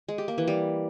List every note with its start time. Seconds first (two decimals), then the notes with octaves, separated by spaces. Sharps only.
0.08 G#3
0.18 G4
0.28 A#3
0.38 E3
0.47 G3